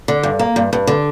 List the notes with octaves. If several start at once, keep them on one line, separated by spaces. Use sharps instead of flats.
D3
G2
A#3
G2
G2
D3